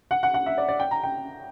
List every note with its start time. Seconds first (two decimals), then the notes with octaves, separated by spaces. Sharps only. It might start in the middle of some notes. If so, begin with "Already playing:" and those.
0.11 F#5
0.23 F#5
0.34 F#5
0.46 E5
0.58 D5
0.68 D5
0.80 G5
0.91 A#5
1.04 G5